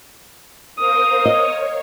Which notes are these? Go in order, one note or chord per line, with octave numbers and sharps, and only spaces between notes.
A#4 C5 F5 D#6
C#5 D#5